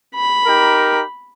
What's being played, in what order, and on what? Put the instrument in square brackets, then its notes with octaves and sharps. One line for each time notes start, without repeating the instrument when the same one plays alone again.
[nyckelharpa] B5
[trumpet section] D#4 G4 A#4